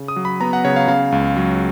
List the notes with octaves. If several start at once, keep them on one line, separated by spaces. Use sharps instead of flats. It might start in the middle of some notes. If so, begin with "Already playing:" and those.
Already playing: C#3
D#6
F#3
B5
B3 A#5
F#5
C#3 C#5
F5
C#3 F5
C#2
F#3